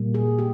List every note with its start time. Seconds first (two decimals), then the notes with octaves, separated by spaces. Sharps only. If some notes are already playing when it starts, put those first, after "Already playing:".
Already playing: A#2 G3 A#3
0.14 G#4
0.39 G4